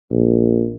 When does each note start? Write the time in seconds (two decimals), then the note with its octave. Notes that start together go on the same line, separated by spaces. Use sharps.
0.11 A#1